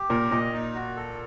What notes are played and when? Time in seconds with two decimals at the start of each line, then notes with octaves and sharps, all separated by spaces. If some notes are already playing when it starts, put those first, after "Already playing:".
Already playing: G4
0.09 A#2 A#4
0.31 A#2 D#5
0.53 D#4
0.74 F#4
0.97 A4